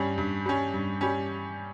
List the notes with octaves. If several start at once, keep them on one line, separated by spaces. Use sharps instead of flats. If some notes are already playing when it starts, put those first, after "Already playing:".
Already playing: G2 G3 C#4
G2
G3 C#4
G2
G3 C#4